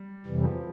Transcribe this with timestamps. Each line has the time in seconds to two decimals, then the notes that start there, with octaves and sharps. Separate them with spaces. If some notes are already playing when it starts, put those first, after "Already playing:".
Already playing: G3
0.26 F2 C3 E3 G3
0.45 F3